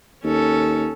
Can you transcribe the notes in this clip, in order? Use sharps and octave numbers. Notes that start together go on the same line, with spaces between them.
D#2 C#4 A4